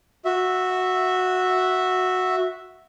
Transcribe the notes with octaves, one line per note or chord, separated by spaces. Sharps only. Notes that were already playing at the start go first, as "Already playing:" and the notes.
F#4 E5